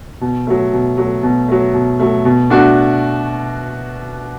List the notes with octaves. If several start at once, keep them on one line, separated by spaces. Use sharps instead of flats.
B2
F#3 A3
B2
F#3 A3
B2
F#3 A3
B2
F#3 A3
B2
A3 D4 F#4